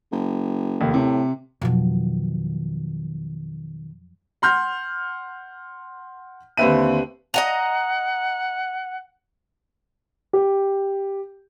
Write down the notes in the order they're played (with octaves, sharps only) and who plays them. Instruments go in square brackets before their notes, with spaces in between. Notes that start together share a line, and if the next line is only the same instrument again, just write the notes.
[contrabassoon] F#1
[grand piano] F1 D#2
[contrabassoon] A2 [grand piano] C3
[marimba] F2 F3 F#3 [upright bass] B2 D#3
[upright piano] F#5 C6 F6 G6
D#2 D3 C4 B4 E5 D#7
[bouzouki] D#5 G#5 A#5 [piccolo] F#5
[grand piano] G4